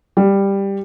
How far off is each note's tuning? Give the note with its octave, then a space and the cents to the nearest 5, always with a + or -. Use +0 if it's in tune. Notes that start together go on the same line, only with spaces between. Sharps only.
G3 +10